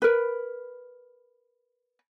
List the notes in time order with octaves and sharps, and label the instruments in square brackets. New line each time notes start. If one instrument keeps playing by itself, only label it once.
[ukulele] A#4 B4